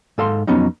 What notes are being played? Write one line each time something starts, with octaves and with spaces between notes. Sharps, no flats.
G#2 A4 F5 C6
F2 F#3 B3 C#4 D#4